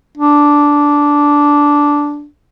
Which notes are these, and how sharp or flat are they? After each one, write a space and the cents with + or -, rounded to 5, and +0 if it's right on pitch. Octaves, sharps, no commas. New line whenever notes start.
D4 -10